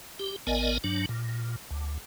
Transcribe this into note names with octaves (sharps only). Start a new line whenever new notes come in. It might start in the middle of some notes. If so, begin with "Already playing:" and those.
G4
A1 B3 A#4 D5 D#5 G#5
G2 F#3 D4
A#2
D2